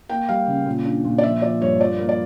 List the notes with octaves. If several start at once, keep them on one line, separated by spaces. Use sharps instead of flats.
A#3 G5
G3 F5
C#3
A#2
D4
A#2
D5
F3 E5
F3 D5
G2 C#5
F3 D5
A#3
D5